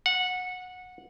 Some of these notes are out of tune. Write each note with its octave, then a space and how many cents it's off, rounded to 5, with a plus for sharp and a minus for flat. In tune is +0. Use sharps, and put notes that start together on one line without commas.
F#5 -15